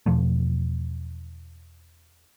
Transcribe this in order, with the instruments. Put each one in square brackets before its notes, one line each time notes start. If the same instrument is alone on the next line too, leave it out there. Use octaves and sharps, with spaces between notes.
[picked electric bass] E2 B2 F3 A3